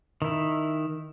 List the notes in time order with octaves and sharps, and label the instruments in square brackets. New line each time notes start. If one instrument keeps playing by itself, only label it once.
[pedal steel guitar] D#3 E4